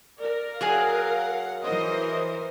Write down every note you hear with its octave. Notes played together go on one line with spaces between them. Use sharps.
A#4 D5
F#3 G#4 F5 F#5 G#5
E3 A#4 C5 D#5